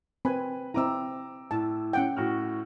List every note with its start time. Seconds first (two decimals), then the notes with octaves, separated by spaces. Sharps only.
0.25 C4 B4 G#5 B5
0.74 C4 E4 A#5 D6 E6
1.51 A2 A5
1.93 C#4 F#5 G5
2.17 A2 F#4 F6